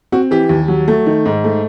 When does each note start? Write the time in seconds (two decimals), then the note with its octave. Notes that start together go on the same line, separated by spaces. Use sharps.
0.12 C4 F#4
0.31 E3 G4
0.49 D#2
0.68 F#3
0.88 A3
1.06 D#3
1.26 G#2
1.44 A3